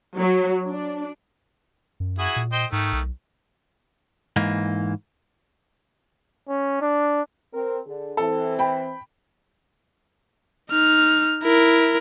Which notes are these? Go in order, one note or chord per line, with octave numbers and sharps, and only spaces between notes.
F#3
D4
F#2
E4 F#4 G#4
A#2
C5 D#5 G5
G#2 D#3 A3
B1
G#2 E3 A#3
C#4
D4
C4 A#4
D3 G#4
E3 C4 A4
G5 B5
D#4 F6
E4 A#4